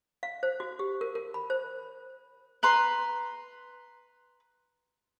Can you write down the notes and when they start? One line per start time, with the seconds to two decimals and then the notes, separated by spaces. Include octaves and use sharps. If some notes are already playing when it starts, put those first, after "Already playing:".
0.23 F5
0.43 C5
0.60 F#4
0.79 G4
1.01 A#4
1.15 A#4
1.34 B5
1.50 C5
2.63 B4 A#5 C6